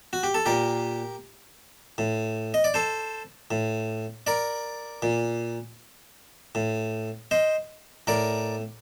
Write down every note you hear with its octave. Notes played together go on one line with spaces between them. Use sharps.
F#4
G4
A4
A#2 G4 A#4
A2
D#5
D5
A4 C5
A2
A#4 D5
A#2
A2
C5 D#5
A2 A#4 D5